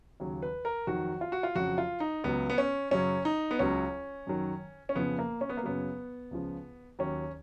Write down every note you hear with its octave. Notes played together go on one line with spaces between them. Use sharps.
D#2 C#3 F#3
B4
A#4
F2 D#3 F#3 F#4
F4
F#4
F4
F2 C#3 F#3 F#4
F4
D#4
C#2 C#3 F#3 B3
B3
C#4
F#2 C#3 F#3 C#4
D#4
B3
C#2 C#3 F#3 C#4
F#2 D#3 F#3
C#4
F2 C#3 F3 B3
A#3
C#4
B3
A#3
F#2 C#3 F#3 B3
C#2 C#3 F3
D#2 D#3 F#3 C#4